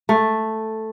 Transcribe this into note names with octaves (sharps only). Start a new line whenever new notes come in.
A3